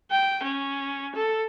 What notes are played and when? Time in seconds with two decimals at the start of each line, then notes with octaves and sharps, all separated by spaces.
0.11 G5
0.44 C#4
1.15 A4